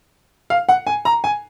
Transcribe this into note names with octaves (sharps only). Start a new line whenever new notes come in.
F5
F#5
G#5
A#5
G#5